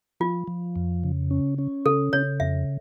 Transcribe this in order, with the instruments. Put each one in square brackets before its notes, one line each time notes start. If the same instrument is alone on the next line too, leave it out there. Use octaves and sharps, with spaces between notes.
[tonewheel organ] F3 [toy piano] F4
[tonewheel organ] F3
F2
C#3
C#4
C#4
[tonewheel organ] C#3 [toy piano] A4
[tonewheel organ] C#3 [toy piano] C#5
[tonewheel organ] F2 [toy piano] E5